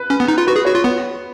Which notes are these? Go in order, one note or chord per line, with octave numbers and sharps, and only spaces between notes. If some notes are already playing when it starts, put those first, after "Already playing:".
Already playing: B4
C#4
B3
D#4
F4
F#4 B4
G#4
F#4 C#5
F4
B3 B4